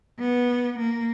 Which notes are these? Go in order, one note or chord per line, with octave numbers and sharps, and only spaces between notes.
B3
A#3